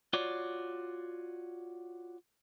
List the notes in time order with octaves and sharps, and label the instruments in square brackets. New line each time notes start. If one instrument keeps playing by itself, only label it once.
[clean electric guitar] F4 F#4 C#5 D5